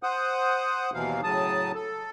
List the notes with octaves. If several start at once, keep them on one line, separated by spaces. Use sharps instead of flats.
C5 F#5 D#6
D#2 B2 E3 F#3 F5
A2 C#3 F#3 A5 D#6
A4